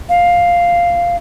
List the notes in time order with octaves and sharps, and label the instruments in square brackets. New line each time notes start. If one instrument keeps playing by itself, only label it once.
[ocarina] F5